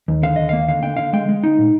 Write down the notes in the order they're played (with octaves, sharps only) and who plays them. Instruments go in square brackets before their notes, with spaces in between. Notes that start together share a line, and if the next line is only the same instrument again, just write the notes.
[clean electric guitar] D#2
D3 F5
D#2 D#5
A#3 F5
D3 F5
D3 G5
D3 F5
G#3 G5
G#3
D#4
A#2